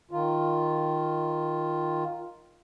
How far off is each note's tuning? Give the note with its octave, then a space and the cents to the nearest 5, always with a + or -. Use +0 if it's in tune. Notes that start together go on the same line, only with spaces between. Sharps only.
D#3 +0 F4 +0